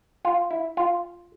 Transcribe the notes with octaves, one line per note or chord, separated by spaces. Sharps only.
F4
E4
F4